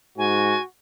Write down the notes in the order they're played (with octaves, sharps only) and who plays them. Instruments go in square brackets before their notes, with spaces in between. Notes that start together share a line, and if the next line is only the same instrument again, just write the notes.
[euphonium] G#2 [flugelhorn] F#4 [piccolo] G#5